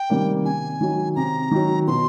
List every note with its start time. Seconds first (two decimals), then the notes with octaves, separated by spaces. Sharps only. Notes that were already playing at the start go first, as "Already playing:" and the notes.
Already playing: G5
0.10 C3 D#3 G3 A#3
0.45 C3 G#5
0.81 D#3 F#3
1.16 C3 A#5
1.51 D#3 F#3
1.87 B2 C6